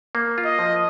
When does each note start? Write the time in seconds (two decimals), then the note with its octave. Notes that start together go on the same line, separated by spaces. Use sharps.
0.15 A#3
0.38 F4
0.45 D#5
0.59 F3